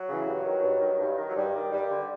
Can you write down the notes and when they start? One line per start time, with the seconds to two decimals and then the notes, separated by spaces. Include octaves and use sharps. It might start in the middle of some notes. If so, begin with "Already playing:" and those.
Already playing: F#3
0.09 C#3 E3
0.27 G2
0.45 D#3
0.63 G2
0.81 D#3
1.00 G2
1.17 D#3
1.29 F#3
1.36 G2 G3
1.55 D#3
1.72 G2 G3
1.91 D3